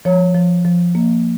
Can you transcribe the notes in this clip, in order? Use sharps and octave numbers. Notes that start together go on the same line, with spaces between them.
F3 C#5
F3
F3
A#3